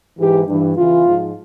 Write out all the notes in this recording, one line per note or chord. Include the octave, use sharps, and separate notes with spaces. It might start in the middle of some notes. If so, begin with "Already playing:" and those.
G#2 E3 G4
G2 E3
E2 C#3 E3 F4
G#2 F3